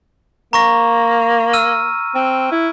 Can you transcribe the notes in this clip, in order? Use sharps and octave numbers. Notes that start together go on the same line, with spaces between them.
A#3 A#5 C#6 A#6
E6 F6 D#7
C4
E4